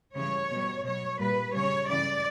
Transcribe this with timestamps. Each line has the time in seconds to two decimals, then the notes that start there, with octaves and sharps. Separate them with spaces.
0.15 C#3 E3 G3 C#5
0.51 B2 G3
0.84 B2 F#3 C#5
1.19 A#2 G3 B4
1.52 C#3 G3 C#5
1.87 C#3 E3 G3 D5